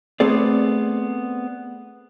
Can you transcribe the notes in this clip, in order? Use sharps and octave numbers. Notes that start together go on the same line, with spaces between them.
A3 B3 C4 G#4 D5